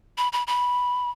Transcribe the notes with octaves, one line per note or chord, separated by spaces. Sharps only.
B5
B5
B5